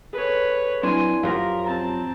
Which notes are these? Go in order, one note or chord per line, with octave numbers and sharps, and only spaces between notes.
G#4 A4 B4 C#5
F#3 C4 D4 E4 B4 G#5 C6
F#2 F3 G4 A#4 F5 C6 A#6
C4 A5 A#5